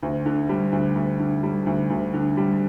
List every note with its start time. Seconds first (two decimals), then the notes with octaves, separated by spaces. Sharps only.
0.03 D2
0.26 D3
0.49 G3
0.72 D2
0.95 D2
1.20 D3
1.43 G3
1.66 D2
1.90 D2
2.14 D3
2.37 G3